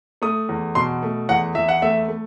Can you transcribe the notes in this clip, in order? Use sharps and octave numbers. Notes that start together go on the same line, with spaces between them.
A3 D#6
E2
B2 C6
A3
E2 F#5
E2 E5
F#5
A3 E5
A3